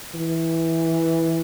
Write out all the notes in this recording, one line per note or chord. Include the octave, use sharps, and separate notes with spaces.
E3